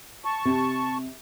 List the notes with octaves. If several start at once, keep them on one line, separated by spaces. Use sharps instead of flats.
A5 C#6
C3